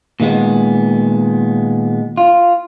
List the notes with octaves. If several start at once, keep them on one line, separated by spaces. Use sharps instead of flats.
A#2 D#3 G#3 B3
F4